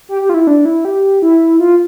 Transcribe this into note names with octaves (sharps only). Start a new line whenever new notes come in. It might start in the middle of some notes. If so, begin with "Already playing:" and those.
G4
G4
F4
E4
D4
E4
G4
E4
F4